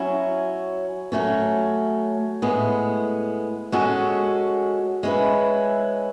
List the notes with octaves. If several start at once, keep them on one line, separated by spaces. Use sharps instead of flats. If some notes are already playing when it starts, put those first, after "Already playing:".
Already playing: F#3 C#4 E4
F#3 A3 C#4
A2 G#3 B3
G#3 C#4 F#4 A4
G#3 C#4 E4 B4